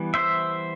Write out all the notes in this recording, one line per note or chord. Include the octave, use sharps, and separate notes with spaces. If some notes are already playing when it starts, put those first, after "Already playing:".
Already playing: E3 G3 B3
C5 E5